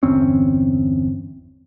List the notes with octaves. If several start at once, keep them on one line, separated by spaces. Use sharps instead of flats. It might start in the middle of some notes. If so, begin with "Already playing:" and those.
G1 E2 C4 C#4